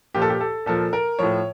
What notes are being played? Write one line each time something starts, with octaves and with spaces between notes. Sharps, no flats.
A#2 F3 G4
A4
G4
A4
A#2 F3 A4
A#4
A2 F3 C#5